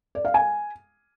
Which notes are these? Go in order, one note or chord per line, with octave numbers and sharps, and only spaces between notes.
D5
F5
G#5